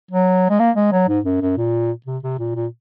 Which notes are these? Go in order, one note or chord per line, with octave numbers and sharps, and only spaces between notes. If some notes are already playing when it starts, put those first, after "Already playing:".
F#3
G#3
A#3
G#3
F#3
G#2
F#2
F#2
A#2
C3
C3
A#2
A#2